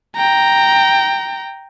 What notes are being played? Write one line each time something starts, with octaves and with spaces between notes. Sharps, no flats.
G5 A#5